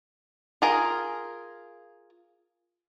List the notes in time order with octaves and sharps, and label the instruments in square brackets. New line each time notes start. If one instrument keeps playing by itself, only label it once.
[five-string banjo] F4 G#4 A#4